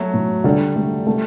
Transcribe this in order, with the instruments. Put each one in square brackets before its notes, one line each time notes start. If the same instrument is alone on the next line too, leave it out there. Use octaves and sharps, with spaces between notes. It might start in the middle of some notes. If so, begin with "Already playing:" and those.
Already playing: [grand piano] F#3 A3 [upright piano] B3 F#4
[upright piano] A2
[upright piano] D3 [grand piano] G3
[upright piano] A3
A3